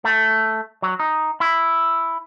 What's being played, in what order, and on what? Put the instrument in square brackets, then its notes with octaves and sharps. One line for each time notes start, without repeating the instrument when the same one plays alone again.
[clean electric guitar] A3
F#3
D#4
E4